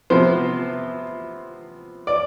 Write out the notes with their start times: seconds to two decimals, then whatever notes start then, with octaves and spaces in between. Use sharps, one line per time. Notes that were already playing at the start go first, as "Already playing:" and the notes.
0.10 C3 F3 B3 C5
2.07 D5